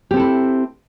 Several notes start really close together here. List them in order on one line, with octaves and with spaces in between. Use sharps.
G4 C4 A4 E4